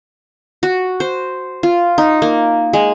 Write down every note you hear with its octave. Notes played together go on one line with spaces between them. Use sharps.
F#4
C5
F4
D#4
A#3
G#3